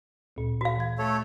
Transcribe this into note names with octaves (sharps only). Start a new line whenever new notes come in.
D2 A#2
F#4 F5
E3 G#6
A3 A4 C#5